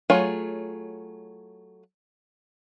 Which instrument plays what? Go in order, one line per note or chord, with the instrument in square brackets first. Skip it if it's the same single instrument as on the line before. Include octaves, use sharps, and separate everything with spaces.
[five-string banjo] F#3 A3 F4 G#4 C#5